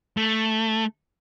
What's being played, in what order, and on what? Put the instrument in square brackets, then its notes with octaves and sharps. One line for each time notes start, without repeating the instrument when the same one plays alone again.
[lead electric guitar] A3